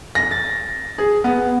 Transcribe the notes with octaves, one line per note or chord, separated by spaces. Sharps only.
A#6
A6
G#4
B3